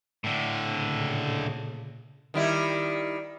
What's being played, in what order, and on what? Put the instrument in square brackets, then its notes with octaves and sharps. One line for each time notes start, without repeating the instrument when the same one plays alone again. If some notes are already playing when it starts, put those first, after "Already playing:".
[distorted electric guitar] A2 D3
[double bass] A#2 C#3
[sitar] D#3 G3 E4